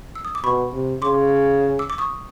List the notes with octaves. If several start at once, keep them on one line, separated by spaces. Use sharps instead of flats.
E6
D#6
D6
B2 B5 C#6
C3
C#3 C6 D6
D6 E6
D6
C#6 D#6